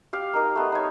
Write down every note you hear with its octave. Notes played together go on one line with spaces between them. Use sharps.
G4 F5
A#3 D#4 A#4
A3 B3
D#4 C#5